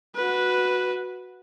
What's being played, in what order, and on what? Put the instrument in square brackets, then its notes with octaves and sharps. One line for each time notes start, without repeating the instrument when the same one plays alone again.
[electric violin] F#4 B4